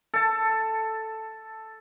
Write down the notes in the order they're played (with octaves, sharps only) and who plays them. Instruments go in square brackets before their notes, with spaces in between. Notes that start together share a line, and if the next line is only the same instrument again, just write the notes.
[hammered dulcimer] A4 A5